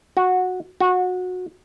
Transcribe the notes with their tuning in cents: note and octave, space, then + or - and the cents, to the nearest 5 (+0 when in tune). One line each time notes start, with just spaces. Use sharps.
F#4 -10
F#4 -20